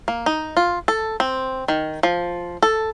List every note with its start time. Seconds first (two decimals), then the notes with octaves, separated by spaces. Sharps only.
0.08 A#3
0.26 D#4
0.57 F4
0.88 A4
1.20 C4
1.68 D#3
2.03 F3
2.63 A4